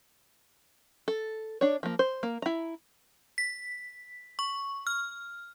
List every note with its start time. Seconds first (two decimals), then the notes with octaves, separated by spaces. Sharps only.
1.08 A4
1.61 D4 C#5
1.83 F3 A#3
1.99 C5
2.23 A#3
2.42 E4 A#5
3.38 B6
4.39 C#6
4.87 F6